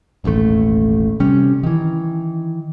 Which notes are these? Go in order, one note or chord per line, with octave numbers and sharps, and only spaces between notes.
E1 A1 D#2 A3
C3 G3 C#4
D#3 E3